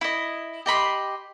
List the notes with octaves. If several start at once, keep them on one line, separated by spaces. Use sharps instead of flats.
E4 D#5
G4 D#5 B5 C6